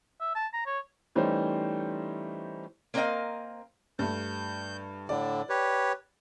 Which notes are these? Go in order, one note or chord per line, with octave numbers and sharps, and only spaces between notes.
E5
A5
A#5
C#5
E3 G3 A3 C#4 D#4 C5
A#3 C4 A#4 C5 D#5 F5
G2 A3 G6
A2 D3 D5
G4 B4 C#5